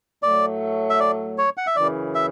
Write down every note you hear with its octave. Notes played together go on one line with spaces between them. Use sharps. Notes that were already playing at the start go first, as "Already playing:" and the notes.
A2 F#3 A3 D5
E5
D5
C#5
F#5
E5
F#2 C#3 E3 D5
E5